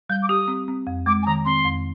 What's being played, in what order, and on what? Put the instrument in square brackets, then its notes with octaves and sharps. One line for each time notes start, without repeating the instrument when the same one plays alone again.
[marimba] G3 [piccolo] G6
[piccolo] D6
[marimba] G4 [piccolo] D#6
[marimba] C4
C4
F2
[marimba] G#3 [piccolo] D6
[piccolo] G#5
[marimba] D#3 [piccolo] A#5
[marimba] C4 [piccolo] C6
[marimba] F2